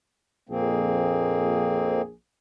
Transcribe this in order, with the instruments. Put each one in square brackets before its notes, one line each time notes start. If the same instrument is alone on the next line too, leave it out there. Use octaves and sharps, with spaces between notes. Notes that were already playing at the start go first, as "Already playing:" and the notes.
[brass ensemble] A#1 G#4 [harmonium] F2 A#3 C4